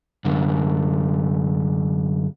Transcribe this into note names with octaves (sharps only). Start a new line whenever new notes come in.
F#2 D3